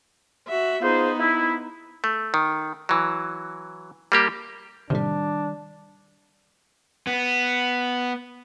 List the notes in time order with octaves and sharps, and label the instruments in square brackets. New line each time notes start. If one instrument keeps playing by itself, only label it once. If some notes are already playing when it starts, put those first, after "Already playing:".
[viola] F#4 E5
[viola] B3 D#4 [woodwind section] F4 G#4 C5
[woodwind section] E4
[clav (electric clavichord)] A3
D#3
E3 F#3
G3 A#3 G4
[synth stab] A2 C3 [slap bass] D#3 G3 [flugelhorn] D4
[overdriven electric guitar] B3